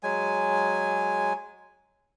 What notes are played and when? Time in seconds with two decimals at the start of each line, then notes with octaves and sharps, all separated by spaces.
0.03 F#3 G#3 G#5